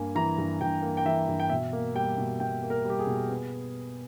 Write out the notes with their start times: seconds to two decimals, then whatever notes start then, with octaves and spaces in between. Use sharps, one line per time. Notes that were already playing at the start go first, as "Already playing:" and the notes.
Already playing: G2 A#3 G#5
0.15 E3 A#5
0.38 G2
0.61 G2 G5
0.82 A#3
0.97 G5
1.05 E3 E5
1.28 G2
1.40 G5
1.50 B2 E5
1.73 A#3
1.95 G3 G5
2.18 B2
2.40 B2 G5
2.63 A#3
2.70 A#4
2.85 G3 G4
2.99 G#4
3.07 B2
3.29 B3